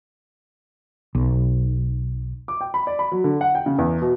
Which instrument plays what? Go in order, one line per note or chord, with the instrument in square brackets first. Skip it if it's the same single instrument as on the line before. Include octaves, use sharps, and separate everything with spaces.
[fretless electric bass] B1
[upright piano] D6
G5
B5
D5
B5
F#3
D3
F#5
G5
C#3
E2
B2